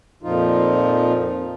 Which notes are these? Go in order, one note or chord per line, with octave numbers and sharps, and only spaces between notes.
F2 A#2 F3 D#4 F4